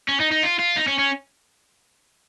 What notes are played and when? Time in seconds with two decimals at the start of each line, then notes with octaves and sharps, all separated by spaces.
0.08 C#4
0.20 D#4
0.31 D#4
0.43 F4
0.59 F4
0.76 D#4
0.87 C#4
0.99 C#4